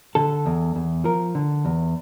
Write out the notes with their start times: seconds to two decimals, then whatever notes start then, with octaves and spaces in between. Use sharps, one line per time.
0.15 D3 A4
0.46 E2
0.75 E2
1.04 F3 A#4
1.35 D3
1.65 E2